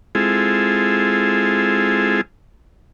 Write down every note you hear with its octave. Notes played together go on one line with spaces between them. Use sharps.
G#3 C4 E4 F4 G#4 A4